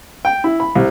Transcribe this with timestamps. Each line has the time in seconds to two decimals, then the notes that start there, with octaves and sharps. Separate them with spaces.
0.25 G5
0.44 E4
0.60 B5
0.75 C2